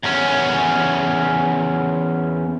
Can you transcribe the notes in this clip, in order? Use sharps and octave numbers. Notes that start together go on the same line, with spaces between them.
E2 C#4